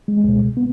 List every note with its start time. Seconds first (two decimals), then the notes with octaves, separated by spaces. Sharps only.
0.08 G#3
0.24 C#2 B2 G#3
0.57 B3